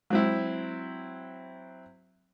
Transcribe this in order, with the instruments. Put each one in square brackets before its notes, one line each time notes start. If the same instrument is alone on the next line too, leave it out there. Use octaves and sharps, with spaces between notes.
[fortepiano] F#3 C4 E4 [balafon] G#3